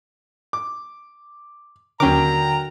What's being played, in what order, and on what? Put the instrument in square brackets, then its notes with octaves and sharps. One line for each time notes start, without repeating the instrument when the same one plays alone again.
[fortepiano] D6
[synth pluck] D#2 C#4 D6 [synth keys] D3 G5 [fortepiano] F#3 A#4 [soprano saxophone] A#5